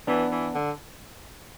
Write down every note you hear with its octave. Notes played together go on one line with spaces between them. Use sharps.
E3 B3 D4
E3
D3